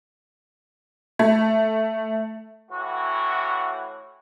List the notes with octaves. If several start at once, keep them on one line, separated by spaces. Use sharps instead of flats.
A3
A2 E3 F#4